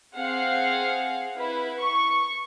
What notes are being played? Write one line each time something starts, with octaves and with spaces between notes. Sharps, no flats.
C4 G#4 F5 F#5
E4 B4
C#6